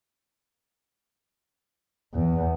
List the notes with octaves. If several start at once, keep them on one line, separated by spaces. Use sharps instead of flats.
E2